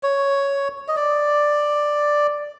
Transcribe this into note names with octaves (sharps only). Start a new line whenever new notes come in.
C#5
D#5
D5